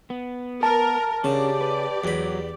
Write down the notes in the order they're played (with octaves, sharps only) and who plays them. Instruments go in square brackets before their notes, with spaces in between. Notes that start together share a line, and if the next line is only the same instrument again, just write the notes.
[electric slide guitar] B3
[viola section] A#4 [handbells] A5
[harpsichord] C#3 [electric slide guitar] C#4 D4 A#4 [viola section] G4 D5
[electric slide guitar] B4
[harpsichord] E2 B5 [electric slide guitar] F#3